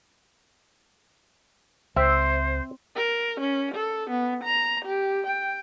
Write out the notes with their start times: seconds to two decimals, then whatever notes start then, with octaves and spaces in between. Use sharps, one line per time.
1.96 C#2 C4 C5 E5
2.96 A#4
3.40 C#4
3.75 A4
4.10 B3
4.44 A#5
4.85 G4
5.27 G5